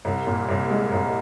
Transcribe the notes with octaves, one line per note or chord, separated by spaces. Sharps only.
C2
A#2
C2
G#3
C2